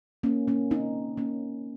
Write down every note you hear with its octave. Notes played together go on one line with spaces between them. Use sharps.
A#3 C#4
A#3 C#4
C4 D#4
A#3 C#4